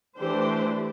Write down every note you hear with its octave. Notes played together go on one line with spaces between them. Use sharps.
E3 A3 D4 G4 C5